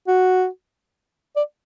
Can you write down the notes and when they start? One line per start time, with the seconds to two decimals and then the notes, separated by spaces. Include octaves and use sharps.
0.08 F#4
1.36 D5